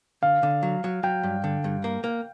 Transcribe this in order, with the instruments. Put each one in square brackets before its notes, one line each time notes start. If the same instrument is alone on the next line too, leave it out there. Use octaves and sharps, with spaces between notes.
[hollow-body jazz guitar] D3 [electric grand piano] F5
[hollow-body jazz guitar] D3
F#3
F#3
[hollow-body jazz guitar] F#3 [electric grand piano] G5
[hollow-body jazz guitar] G2
D3
G2
A#3
A#3